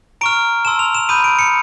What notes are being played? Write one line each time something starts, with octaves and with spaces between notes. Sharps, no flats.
A#5 C#6 F6 D7
A5 C6 E6 E7
F7
E7
B5 D#6 G6 D#7
D7
C#7